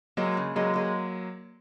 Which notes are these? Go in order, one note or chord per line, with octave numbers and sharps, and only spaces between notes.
F#3 G#3 A#3
C#3
F#3 G#3 A#3
G#3